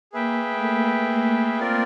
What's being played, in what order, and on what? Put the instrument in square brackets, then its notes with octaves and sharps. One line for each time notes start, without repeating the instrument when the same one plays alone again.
[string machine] A#3 [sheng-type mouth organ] G#4 B4 E5 G5
[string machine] A3
A#3
[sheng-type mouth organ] C4 F4 A#4 D5